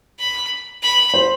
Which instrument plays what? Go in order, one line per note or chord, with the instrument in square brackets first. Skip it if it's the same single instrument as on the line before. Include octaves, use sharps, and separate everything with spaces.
[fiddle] B5
B5
[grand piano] C5